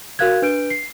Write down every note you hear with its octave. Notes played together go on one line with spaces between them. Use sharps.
F#4 A#4 F5 F#6 G#6
D4 B4 G6 D7
C7